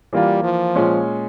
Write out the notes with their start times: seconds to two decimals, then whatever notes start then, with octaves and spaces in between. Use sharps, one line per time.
0.13 E3 G3 A#3 F4
0.44 F3
0.75 A#2 G#3 C#4